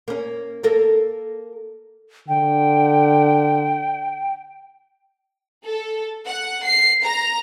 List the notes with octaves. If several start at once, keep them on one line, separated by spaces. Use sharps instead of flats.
A#3 C#4
A#3 A4 A#4
D3 G5
A4
F#5
C7
A#5